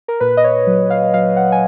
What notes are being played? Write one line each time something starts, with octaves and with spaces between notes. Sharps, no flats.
A#4
A#2 B4
D#5
C#5
F#3
F5
F#3 F5
F#5
G#5